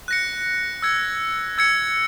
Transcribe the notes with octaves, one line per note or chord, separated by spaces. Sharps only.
F#6 A#6 C#7
E6 G#6 C#7
E6 G#6 C#7